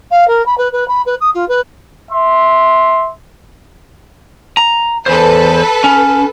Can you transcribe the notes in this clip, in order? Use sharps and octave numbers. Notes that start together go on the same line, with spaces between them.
F5
A#4
B5
B4
B4
B5
B4
D#6
F4
B4
E5 C6
A#5
E2 A4 B4 C5
C#4